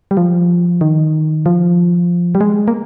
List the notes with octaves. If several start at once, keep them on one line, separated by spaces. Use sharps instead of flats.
G3
F3
D#3
F3
G3
G#3
A#3